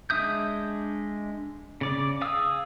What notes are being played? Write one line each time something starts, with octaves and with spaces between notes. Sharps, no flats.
G#3 D4 E5 D#6 G6
C#3 D5 D6
G#4 F5 D#6 E6